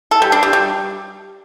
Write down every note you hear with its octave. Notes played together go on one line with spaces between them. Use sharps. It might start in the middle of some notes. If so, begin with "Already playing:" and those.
A4
G3
D4
G3
G3